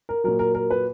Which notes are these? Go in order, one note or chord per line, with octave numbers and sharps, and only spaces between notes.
A#4
A#2 F#3 A#4
A#4
A#4
B4